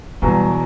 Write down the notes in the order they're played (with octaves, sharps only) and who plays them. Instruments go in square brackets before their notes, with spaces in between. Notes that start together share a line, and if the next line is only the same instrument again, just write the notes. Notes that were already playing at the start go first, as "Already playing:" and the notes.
[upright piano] E2 B2 F#3 [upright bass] G3